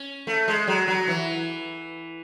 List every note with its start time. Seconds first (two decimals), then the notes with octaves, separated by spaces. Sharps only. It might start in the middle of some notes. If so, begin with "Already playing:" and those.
Already playing: C#4
0.27 A3
0.48 G#3
0.68 F#3
0.88 F#3
1.08 E3